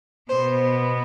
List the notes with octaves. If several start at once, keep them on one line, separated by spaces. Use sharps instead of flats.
B2 B3 C5